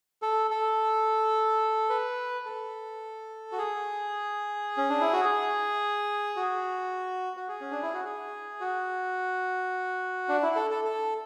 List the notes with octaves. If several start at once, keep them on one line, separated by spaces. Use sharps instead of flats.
A4
A4
B4
A4
F#4
G#4
C#4
D4
E4
F#4
G#4
F#4
F#4
G#4
C#4
D4
E4
F#4
G#4
F#4
D4
E4
A4
A4
A4